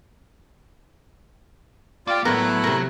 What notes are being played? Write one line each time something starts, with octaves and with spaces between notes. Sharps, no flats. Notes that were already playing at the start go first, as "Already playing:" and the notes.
A#3 F4 D5 G5
A2 F#3 A3 B3 E4 A#4 F#6
C3 A#4